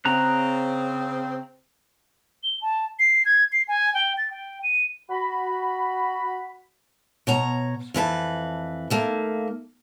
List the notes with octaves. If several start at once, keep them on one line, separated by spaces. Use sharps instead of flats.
C#3 C4 A#5 F#6
G7
A5
C7
G#6
C7
G#5
G5
A6
G5
D#7
F#4 B5
B2 C#5 A#5
F2 E3 B4 A5
D#2 A3 A#3